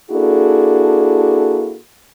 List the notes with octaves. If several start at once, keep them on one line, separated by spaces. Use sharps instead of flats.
A#3 D4 E4 F#4 G#4 A4